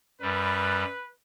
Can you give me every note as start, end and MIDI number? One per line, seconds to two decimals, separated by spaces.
0.22 0.84 42
0.22 0.84 55
0.22 1.10 71